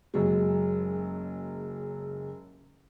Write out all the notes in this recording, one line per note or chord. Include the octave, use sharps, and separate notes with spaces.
F#1 F#3 G#3